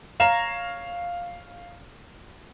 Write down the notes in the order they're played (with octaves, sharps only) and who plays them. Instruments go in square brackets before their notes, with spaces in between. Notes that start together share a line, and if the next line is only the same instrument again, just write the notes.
[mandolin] C#5 A#5 [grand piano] F5 E7